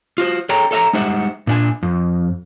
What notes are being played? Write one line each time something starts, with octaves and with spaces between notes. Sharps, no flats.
F4 F#4 C5
G#4 A4 C#5 G5 A#5
A4 C#5 E5 G#5 A#5
G3 G#3 D#4 C5 E5 F#5
A#2 D4 G#5
F2